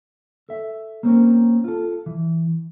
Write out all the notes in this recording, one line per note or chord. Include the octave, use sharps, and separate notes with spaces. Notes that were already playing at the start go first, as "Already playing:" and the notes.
A4 E5
A#3 C4 C#4 A#4
F4 A4
E3